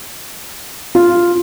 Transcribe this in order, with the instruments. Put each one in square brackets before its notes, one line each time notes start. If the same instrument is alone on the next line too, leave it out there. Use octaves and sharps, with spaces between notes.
[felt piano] F4